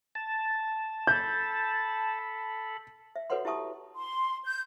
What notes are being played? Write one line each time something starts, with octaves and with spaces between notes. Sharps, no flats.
A5
A4 B5 G6
E5
F#4 A4 B4 C#5 F#5 C6
E4 G4 E5 A5 C#6 D#6
C6
G6